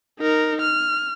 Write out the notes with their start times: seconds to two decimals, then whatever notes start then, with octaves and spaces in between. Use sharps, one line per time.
0.20 D#4 A#4
0.61 F6